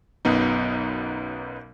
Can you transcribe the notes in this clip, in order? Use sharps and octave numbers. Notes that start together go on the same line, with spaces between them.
B1 F#2 B3 D#4